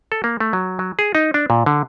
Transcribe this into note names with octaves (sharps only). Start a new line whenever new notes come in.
A4
A#3
A3
F#3
F#3
G#4
D#4
D4
A#2
D3